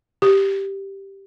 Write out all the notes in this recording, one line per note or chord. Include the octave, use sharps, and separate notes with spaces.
G4